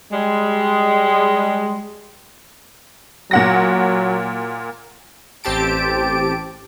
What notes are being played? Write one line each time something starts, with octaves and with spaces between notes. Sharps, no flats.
G3 G#3
A#2 F#3 F#5 A#6
A1 C4 G4 A5 D7